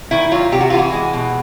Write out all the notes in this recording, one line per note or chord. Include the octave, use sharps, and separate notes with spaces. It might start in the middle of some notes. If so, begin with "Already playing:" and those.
D#3 E4
F#3 F4
C3 G4
F#4
E3 F4
F#4
G#3
B2